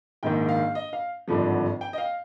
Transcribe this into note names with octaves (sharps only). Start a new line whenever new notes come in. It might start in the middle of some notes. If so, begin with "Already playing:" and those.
A#1 G#2 D#3 G5
F5
D#5
F5
G#1 G2 D3 F3
G5
D#5
F5